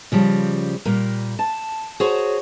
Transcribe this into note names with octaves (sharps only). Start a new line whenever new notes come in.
C#3 F3 G3
A#2 G3 A#3
A5
F#4 G#4 C5 C#5